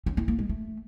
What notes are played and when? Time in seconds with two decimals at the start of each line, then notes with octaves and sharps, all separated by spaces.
0.06 C#4
0.17 E4
0.28 A#3
0.39 G#3
0.49 A3